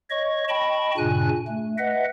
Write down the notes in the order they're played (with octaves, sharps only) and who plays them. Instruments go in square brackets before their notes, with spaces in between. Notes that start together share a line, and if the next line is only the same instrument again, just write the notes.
[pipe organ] C#5 D#5 C#6
D#5 G5 A5 B5 C#6
G2 A#2 C#3 D4 G#5 F#6
A3
B4 D#5 E5 F#5